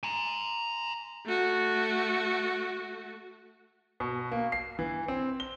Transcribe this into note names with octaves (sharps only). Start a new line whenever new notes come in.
G#5 A#5
A3 F#4
B2
A#3
C7
E3
C4
G7